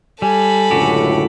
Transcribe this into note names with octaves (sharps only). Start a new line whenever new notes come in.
G3 A4 G#5 B5
C#2 F#2 A2 D3 F#4 G4